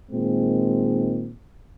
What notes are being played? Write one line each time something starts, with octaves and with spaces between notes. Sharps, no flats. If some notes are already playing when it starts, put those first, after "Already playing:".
A#2 D#3 G#3 C4